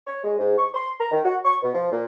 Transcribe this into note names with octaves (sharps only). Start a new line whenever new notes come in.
C#5
G#3
G#2
C#6
C6
A#5
D#3
F#4
C#6
B2
F3
A#2